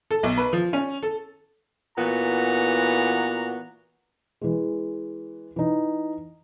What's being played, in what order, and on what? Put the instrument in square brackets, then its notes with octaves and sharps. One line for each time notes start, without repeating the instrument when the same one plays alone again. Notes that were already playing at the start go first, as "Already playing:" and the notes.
[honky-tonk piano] A4
B1
B4
F3
C#4
A4
[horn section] A#2 E3 B3 F#4 A#5
[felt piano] E3 G#3
E3 D#4